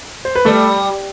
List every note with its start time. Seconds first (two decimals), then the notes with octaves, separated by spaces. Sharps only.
0.25 C5
0.36 B4
0.45 G3 A3 A4